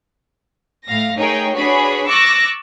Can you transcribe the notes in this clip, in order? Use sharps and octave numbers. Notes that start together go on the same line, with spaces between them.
A2 F5 A#6
A3 D#4 G#4 A#4 C#5 G5
D4 F#4 G#4 B4 C#5 B5
C#6 D6 E6 F#6 A6 A#6